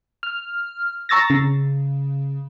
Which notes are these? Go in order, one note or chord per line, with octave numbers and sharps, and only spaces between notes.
F6
A#5 C#6 E6 A6 A#6
C#3